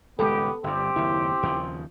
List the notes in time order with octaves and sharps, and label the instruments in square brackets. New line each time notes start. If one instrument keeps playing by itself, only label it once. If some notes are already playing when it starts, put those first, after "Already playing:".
[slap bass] D#1 C#2 G#3 [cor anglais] B3 [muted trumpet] G4 [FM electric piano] A4
[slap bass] G1 G2 [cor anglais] C4 [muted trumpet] G4
[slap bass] F#1 D#2 [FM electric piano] E4
[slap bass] D#2 C#3 F3